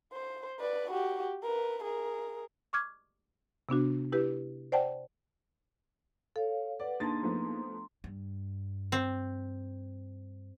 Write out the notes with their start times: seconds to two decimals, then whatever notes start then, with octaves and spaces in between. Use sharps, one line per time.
0.13 C5
0.60 B4 D5
0.91 F#4 G4
1.43 A#4 B4
1.84 G#4 A#4
2.73 C#6 D6 F6 G#6
3.69 C3 B3 D4 F#4
4.12 E4 G4 B4
4.72 C5 D5 F#5 G5 A5
6.36 A4 C#5 F5
6.80 B4 D5 F#5
7.00 A#3 D4 D#4 G#4 A5 A#5 C6 A6
7.23 F3 A3 B3
8.04 G2
8.92 C4